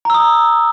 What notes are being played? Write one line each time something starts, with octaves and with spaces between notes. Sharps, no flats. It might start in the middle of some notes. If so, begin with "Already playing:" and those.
A#5 D#6 E6